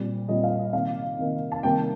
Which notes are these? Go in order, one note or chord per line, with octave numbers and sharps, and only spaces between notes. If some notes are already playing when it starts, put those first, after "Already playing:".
Already playing: A#2 G3 C4
A#2 G3 C4 D#5
F5
D#5
C3 D#3 A#3 D#4 F5
C3 D#3 A#3 D#4
A5
C3 D#3 G3 A#3 G5